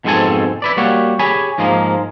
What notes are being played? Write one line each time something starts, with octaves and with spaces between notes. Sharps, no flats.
F2 G#2 B2 C4 A4 G#5
E4 B4 D5
G3 A#3 F#4 G4 C#5 F#5
G4 G#4 C#5 G#5 B5
G#2 F3 G#3 A#3